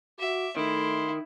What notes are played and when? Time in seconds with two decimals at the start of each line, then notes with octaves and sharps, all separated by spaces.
0.19 F#4 E5 D6
0.57 D#3 A3 E4 C6